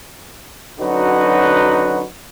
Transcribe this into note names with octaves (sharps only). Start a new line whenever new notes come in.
D3 F#3 C#4 D#4 F#4 B4